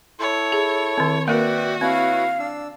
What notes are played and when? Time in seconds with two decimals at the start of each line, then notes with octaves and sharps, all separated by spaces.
0.20 E4 A4 C#5
0.52 G#4
0.98 D#3 C4
1.28 A#3 F#4 A#4 B4 D5 E5 G5
1.81 C4 E4 B4 C#5 F5
2.40 D4 E6